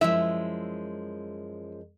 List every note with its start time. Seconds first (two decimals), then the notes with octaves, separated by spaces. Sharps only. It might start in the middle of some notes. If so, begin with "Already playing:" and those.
0.01 F#2 F3 G#3 E4 E5